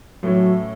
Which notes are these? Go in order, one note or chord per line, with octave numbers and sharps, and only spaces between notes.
A2 E3 F#3 A3 C#4